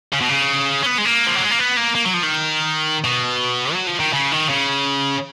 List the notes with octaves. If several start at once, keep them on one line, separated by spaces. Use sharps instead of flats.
C#3
B2
C#3
C#4
B3
G#3
A#3
F3
F#3
G#3
A#3
B3
A#3
A#3
F#3
F3
D#3
B2
F#3
F3
D#3
C#3
D#3
C#3